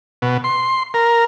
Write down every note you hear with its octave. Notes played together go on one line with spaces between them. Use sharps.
B2
C6
A#4